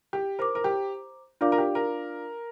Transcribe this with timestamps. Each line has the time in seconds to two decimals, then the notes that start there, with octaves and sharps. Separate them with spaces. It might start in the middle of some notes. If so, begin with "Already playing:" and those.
0.13 G4
0.39 A#4 C5 A#5 D6
0.55 A#4
0.64 G4
1.41 D4 F4 A#4 D5 F5 D6
1.52 A#4
1.58 G4
1.75 A#4